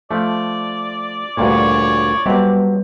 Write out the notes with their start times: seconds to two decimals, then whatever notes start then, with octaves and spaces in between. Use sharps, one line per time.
0.11 F3 A3 D5
1.37 D2 G2 A#2 C#5
2.26 F#3 G3 C4 G4 B4